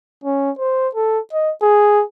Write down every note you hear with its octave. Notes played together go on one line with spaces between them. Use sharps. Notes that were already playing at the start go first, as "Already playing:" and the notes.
C#4
C5
A4
D#5
G#4